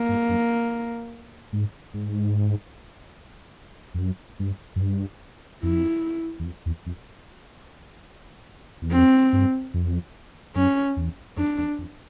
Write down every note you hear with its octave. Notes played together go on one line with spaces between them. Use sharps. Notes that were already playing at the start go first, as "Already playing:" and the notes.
Already playing: A#3
G2
F#2
G#2
G#2
F2
F#2
G2
F#2
G2
F2 E4
E2
F2
E2
F2
E2
F2 C4
G2
F2
F#2 C#4
E2
F2 D4
E2
F2